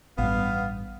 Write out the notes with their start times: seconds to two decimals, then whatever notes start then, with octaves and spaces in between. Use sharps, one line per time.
0.18 A1 G2 B3 F5